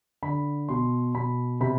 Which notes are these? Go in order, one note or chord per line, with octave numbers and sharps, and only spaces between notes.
D3 B5
B2 C6
B2 B5
C3 B5